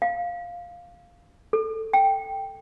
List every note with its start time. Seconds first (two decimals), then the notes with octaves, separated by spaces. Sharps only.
0.02 F5
1.53 A4
1.93 G5